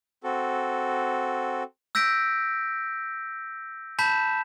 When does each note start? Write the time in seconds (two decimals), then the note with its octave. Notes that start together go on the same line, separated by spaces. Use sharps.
0.24 C4 F#4 A4
1.95 E6 G6 A#6 B6 D7
3.99 A5 B5 G6 B6 E7